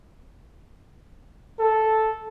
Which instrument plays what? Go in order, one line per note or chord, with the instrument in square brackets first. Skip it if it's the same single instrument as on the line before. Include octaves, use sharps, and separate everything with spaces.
[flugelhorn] A4